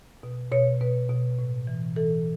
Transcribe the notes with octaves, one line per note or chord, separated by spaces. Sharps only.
B2
B2 C#5
B2 B4
B2
A2
E3
E3 A4